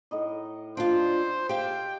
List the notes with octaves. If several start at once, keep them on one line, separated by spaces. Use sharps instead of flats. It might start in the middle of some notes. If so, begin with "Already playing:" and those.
A2 D#4 D#5
D4 F4 A4 C5 A#5
G4 F5 G5